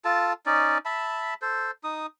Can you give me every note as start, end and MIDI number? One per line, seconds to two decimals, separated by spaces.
0.05 0.33 65
0.05 0.33 69
0.05 0.33 81
0.46 0.78 61
0.46 0.78 63
0.46 0.78 74
0.85 1.34 76
0.85 1.34 81
0.85 1.34 83
1.42 1.71 69
1.42 1.71 72
1.84 2.06 63
1.84 2.06 87